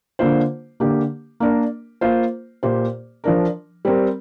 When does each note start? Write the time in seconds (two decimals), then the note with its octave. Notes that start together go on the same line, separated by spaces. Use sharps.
0.19 D3 A#3 F4 C5
0.80 D3 A#3 G4
1.40 A#3 D4 A#4
2.01 A#3 F4 C5
2.63 A#2 A#3 G4 C5
3.24 F3 D4 A#4
3.85 G3 C4 A#4